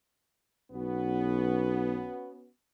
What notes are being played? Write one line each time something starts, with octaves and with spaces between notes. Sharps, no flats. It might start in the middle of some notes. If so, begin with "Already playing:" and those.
B1 B3 C#4 F#4